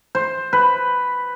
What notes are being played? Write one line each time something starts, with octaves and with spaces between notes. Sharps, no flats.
C5
B4